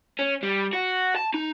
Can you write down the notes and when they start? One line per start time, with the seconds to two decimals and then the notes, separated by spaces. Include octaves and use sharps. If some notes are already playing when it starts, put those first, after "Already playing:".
0.19 C#4
0.43 G3
0.73 F#4
1.16 A5
1.34 D#4